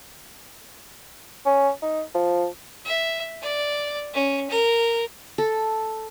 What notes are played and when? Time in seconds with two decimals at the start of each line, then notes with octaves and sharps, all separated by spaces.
1.45 C#4
1.82 D#4
2.15 F3
2.85 E5
3.42 D5
4.14 C#4
4.50 A#4
5.38 A4